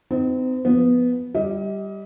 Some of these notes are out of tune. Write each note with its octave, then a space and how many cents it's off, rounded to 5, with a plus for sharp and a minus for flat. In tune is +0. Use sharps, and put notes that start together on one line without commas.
C4 -35 D#4 +0
F3 +0 B3 +0
G3 +0 D#5 +35